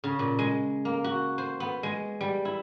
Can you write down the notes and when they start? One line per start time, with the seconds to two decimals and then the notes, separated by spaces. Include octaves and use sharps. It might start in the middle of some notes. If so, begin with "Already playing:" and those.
0.04 C#3
0.19 A#2
0.39 G#3
0.85 A#3
1.04 F#4
1.38 C5
1.60 B3
1.83 G#3
2.21 G3
2.45 E4